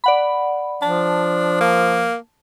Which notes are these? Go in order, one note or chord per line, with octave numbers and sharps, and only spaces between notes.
D5 F#5 B5
F3 D4 A5
A#3